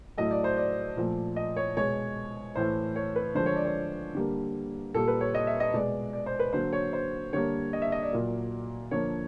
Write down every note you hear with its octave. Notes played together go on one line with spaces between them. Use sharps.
A2 F#3 A3 D#5
D5
C5
D5
A#2 F3 A3
D#5
C#5
B2 G#3 C#5
A2 E3 A3 C5
C#5
B4
D3 F3 G#3 C5
C#5
D5
C#5
D3 G3 A#3
A#2 G3 A#3 A4
B4
C#5
D#5
E5
D#5
B2 G#3 D5
D5
C5
B4
D3 F#3 A#3 C5
C#5
C5
D3 G3 A#3 C#5
D#5
E5
D#5
D5
A#2 F#3 A#3
D3 F3 A#3 C#5